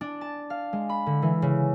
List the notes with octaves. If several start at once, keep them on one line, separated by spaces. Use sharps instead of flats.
D4
A5
F5
G#3
B5
D3
E3
C#3